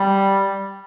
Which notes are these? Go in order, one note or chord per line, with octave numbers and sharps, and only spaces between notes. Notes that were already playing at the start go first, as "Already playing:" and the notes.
Already playing: G3